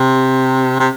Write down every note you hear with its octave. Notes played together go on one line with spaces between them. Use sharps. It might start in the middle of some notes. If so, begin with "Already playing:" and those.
Already playing: C3
C3